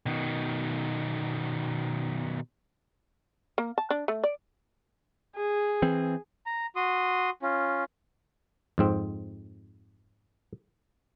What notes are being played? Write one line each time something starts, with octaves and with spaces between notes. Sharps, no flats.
B2 D#3
A#3
A5
D4
A3
D5
G#4
E3 C4
A#5
F#4 C6 D#6
C#4 F4
F2 G#2 C4